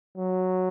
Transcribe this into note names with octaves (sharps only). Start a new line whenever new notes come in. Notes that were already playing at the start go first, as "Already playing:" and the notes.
F#3